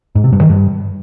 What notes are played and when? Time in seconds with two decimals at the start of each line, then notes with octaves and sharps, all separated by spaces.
0.15 G#2
0.24 C3
0.33 G2
0.41 D#3
0.50 G2